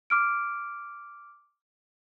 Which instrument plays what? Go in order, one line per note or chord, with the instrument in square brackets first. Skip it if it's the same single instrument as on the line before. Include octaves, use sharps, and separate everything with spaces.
[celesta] D6 F6 D7